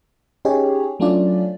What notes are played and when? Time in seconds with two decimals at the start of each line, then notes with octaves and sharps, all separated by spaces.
0.45 C#4 D#4 G4 G#4 C#5
1.00 F#3 A3 C#4 D4 F4 D5